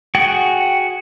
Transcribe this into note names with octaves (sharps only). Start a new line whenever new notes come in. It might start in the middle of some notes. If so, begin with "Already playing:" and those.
F#4 G#4 F#5 G5